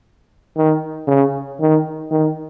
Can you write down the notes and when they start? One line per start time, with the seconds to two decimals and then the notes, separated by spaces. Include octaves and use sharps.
0.57 D#3
1.07 C#3
1.60 D#3
2.11 D#3